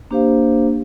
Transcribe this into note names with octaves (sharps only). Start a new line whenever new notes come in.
A#3 D4 G4 C5 F5